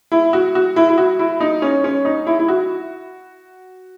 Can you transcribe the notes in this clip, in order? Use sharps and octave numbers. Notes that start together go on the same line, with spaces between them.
E4
F#4
F#4
E4
E4
F#4
E4
D#4
C#4
C#4
D#4
E4
E4
F#4